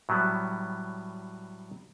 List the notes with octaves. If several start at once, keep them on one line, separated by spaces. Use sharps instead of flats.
A2 F#3 G3 B3